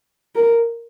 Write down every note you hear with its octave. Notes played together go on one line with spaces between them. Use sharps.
A#4